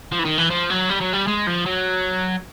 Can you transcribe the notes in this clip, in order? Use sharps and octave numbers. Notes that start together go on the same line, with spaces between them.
F3
E3
D#3
E3
F3
F#3
G3
F#3
G3
G#3
F3
F#3